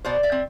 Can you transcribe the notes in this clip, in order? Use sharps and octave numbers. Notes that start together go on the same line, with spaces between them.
B2 C5 D5
D5 E5
C4